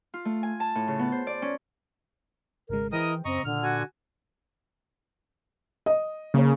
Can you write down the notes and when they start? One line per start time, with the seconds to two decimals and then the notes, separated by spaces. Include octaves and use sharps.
0.14 F4
0.25 A3
0.43 G#5
0.60 A5
0.75 A2
0.87 C#3
0.99 B3
1.12 C5
1.27 D5
1.42 C#4
2.69 G#1 C#3 G#3 A#4
2.92 E3 E4 G#4 A#4 C5 D#5 G5 D#6
3.25 F#2 C#3 C4 D#5 A#5 C#6
3.45 A#2 D3 F6
3.63 F#4 G#5
5.86 D#5
6.34 C#3 A#3 C#5